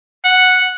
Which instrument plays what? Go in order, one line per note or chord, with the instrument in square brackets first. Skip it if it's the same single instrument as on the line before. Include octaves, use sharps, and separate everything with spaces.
[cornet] F#5